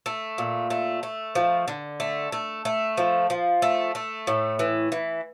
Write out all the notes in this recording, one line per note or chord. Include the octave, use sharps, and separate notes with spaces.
A3
A#2
A3
A3
F3
D3
A3
A3
A3
F3
F3
A3
A3
A2
E3
E3